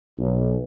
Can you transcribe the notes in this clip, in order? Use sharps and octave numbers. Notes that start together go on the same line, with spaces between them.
B1